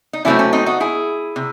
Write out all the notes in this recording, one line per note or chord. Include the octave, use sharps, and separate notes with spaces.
D#4
C3 F#3 A3 C4 C#4 E4
C#4
C4 D#4
D#4 F#4
E4 G#4
C3